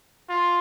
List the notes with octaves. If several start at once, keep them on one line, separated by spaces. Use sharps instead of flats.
F4